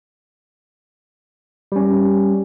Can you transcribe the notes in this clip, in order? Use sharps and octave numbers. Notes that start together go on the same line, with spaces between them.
G3 C#4